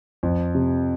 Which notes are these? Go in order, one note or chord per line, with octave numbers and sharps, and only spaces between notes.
F2
C3